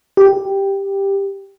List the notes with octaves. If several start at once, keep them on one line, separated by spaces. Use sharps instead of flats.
G4